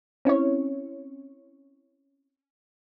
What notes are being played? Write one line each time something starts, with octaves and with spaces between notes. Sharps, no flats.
C4 C#4 E4 C#5